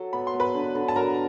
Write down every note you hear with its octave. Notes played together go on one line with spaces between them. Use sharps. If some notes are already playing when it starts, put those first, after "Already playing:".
Already playing: F#3 A4
B3 B5
C6
B3
B4 B5
D3
D3
A5
F#3 A#4 A#5